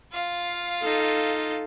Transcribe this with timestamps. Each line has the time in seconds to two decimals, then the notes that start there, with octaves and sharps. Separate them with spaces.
0.12 F4 F5
0.82 D#4 A4